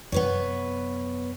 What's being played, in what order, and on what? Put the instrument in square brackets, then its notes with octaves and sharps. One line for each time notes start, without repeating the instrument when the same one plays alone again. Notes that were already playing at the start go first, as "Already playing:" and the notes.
[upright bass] F#2 C3 [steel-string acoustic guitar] B3 B4 C#5